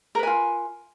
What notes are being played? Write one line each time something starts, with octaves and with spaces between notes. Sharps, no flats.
F4 A#4 B4 G#5